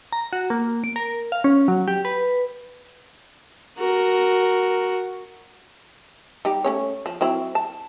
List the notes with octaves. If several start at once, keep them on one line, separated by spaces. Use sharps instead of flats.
A#5
F#4
A#3
D7
A#4
F5
C#4
F#3
G4
B4
F#4 A#4
G3 D#4 G4
A3 C#4 C#5
F3
F#3 C4 E4
A5